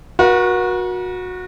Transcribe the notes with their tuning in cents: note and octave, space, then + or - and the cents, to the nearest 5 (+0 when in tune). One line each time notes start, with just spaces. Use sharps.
F#4 -20 A#4 +45